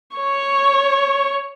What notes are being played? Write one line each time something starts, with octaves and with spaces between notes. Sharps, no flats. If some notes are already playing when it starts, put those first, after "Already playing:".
C#5 C#6